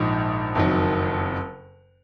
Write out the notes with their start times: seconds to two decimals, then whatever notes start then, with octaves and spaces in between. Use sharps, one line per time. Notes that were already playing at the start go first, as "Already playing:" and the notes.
Already playing: A#1 G#2 F3
0.55 F#1 F2 D#3 F#3